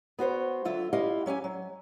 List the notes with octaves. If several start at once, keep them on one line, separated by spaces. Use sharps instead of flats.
B3 F#4 C5 C#5
D3 F#3 F4 E5
E4 F4 G4 D#5 F5
F#3 C#4 G4 G#5
F#3